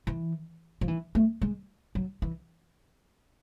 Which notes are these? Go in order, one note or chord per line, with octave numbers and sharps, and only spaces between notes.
E3
F3
E3
A3
G#3
F#3
E3